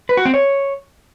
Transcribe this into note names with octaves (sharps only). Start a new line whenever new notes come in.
B4
F#4
C4
C#5